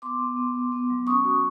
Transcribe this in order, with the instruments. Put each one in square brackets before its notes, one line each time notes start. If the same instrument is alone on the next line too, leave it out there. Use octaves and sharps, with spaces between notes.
[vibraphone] B3 C6 D6
B3
B3
B3
B3
F#3
C#4 C#6 D#6
F#4